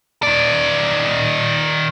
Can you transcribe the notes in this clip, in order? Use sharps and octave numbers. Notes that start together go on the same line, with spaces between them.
D#3 D5